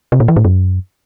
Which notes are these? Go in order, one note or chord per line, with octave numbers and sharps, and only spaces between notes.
C3
A#2
E3
A2
F#2